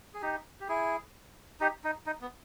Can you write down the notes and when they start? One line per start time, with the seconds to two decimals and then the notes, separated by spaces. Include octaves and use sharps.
0.14 G#4
0.22 D#4 G4
0.60 G4
0.68 E4 G#4
1.60 D#4 G4
1.84 D#4
2.06 D#4
2.22 B3